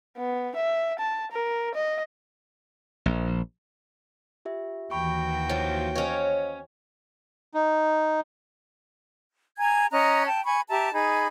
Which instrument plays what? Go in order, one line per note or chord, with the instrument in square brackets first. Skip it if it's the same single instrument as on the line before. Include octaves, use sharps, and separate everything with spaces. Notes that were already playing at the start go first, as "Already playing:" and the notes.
[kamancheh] B3
E5
A5
A#4
D#5
[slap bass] A#1
[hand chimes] F4 G4 E5
[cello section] D#2 E3 F#4 [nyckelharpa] G5 [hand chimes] B5 C#6
[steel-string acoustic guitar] F3 F4 [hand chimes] C#5
[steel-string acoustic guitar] C#4 C#5 [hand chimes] C5 D#5 F5
[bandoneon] D#4
[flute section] G#5 A#5 G#6
C#4 D#5 A#5 F#6
G5 A5
G#5 B5 C#6
G4 E5 A5 A#5
D#4 G#4 B5